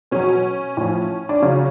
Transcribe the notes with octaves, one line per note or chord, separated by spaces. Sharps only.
B2 F#3 C#4
A2 F3
D4
C#3 F#3 C#4